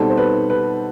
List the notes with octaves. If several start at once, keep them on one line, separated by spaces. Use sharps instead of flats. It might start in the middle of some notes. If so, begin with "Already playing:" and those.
Already playing: B2 G3 C4 D#4 A4
C5
B4
B4